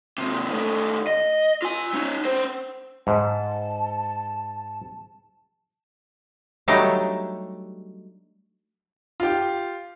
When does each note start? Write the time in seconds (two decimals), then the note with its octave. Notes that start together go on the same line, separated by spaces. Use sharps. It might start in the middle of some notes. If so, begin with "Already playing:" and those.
0.18 D#2 C3
0.50 D#3 A3
1.07 D#5
1.62 F4 G#5
1.94 C#4 D#4
2.25 C#4 C5
3.07 G#2 A5
6.68 F#3 G3 A3 D4 D#4 G4
9.20 F4 G4